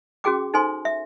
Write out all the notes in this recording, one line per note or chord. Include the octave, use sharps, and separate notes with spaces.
C#4 F#4 G#4 G5 D6
D#4 A4 C5 G#5 C6
E5